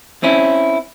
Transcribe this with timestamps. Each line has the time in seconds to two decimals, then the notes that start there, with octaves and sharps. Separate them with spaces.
0.23 C4 C#4 E4